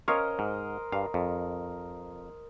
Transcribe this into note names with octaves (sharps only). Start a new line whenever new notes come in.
C#4 A#4 C5 C#5 D#5 F5
G#2
G2 F5
F2